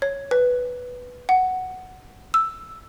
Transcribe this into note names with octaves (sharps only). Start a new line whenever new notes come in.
C#5
B4
F#5
E6